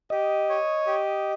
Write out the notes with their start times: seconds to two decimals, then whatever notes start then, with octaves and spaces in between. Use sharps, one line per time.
0.10 G4 D#5
0.49 C#5
0.87 G4